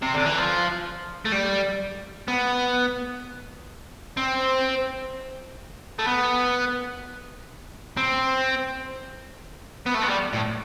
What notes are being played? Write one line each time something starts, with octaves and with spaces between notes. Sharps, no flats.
C3
D3
E3
F3
A3
G3
B3
C4
A3
B3
C4
B3
A3
B3
G3
A2